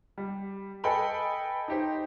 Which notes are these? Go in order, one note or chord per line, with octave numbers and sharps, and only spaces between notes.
G3
A4 B4 D#5 G5 G#5 B5
D#4 G4 C5